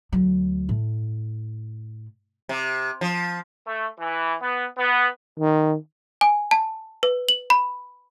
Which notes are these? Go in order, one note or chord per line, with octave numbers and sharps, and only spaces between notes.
D2 F#3
A2
C3
F3
A3
E3
B3
B3
D#3
G#5
A5
B4
F#7
B5